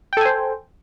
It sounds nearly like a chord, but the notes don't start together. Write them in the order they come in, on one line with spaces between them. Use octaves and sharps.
G5 A4 G#5 C5